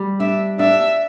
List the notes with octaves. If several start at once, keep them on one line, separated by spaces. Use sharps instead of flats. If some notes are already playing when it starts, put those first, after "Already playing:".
Already playing: G3
D4 E5
D4 E5